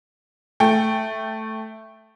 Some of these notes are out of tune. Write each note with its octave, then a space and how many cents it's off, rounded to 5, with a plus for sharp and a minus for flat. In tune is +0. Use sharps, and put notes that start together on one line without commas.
A3 +0 G5 +0